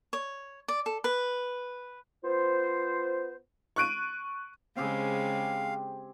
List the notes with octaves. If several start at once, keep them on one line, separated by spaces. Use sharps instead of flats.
C#5
D5
A4
B4
B3 F4 C5
C#6 F#6 D7 D#7
C#3 G#3 C4 G4 G#4 F5